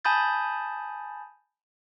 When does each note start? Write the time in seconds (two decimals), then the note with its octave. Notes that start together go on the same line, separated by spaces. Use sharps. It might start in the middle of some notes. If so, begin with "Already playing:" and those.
0.05 G#5 A5 B5 D#6 G6 A6